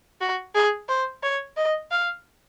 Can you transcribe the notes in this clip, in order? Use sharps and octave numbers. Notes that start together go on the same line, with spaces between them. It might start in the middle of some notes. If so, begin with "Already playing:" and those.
F#4
G#4
C5
C#5
D#5
F5